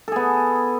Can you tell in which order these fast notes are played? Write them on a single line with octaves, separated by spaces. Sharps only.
A4 G#4 B3